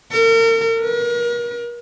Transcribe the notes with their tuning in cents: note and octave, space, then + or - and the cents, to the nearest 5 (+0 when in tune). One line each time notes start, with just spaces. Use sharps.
A#4 -40
A#4 +40